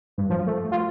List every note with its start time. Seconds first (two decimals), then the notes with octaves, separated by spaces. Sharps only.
0.18 G2
0.30 F3
0.47 A3
0.72 F4